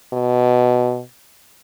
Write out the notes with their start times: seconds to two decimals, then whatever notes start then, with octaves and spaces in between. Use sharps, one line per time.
0.13 B2